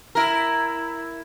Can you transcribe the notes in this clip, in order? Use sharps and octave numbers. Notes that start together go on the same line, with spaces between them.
E4 A#4